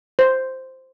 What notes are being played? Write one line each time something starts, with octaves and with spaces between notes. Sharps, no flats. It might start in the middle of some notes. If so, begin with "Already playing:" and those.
C5